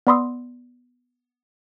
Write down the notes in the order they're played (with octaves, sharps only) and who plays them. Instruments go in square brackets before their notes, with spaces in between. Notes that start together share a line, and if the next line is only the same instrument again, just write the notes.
[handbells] B3 D5 B5 C6 D#6 E6